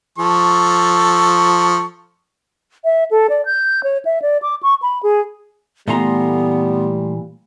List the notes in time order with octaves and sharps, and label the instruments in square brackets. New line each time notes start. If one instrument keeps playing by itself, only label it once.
[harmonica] F3 A4 C#6
[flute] E5
A4
D5
G6
C#5
E5
D5
D6
C#6
B5
G#4
[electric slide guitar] A#2 E3 A#5 [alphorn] G3 [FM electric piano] A3 C6 [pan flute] B3